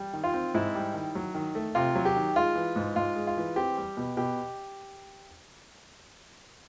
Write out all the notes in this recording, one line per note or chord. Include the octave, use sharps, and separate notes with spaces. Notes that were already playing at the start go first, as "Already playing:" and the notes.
Already playing: G3
D#3
F4
C4
G#2 E4
G3
D#3
F#3
D#3
A3
C3 F4
F#3
G4
D#3
G#3 F4
E3
G#2
G#2 F4
G#3
F4
E3
C4 G4
G3
B2
B2 G4